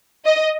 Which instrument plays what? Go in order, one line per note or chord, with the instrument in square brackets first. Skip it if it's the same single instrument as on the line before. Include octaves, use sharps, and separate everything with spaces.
[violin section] D#5